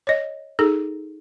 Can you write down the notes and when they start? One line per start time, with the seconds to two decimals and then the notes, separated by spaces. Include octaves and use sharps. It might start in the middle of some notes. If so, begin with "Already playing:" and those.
0.07 C#5 D#5
0.59 D#4 G#4 A4